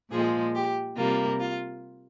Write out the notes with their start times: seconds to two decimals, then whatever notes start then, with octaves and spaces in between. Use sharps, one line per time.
0.11 A#2 F3 G#3 G#4
0.55 G4
0.96 C3 G3 A#3 F4
1.40 F4